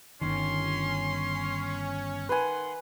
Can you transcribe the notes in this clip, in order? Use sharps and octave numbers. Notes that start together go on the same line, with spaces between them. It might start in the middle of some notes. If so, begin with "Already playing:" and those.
G1 D#3 C#4 C6
D#3 B4 F#5 G#5 C6